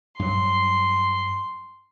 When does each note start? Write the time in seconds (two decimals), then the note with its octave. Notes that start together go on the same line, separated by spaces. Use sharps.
0.19 G2 F#3 C6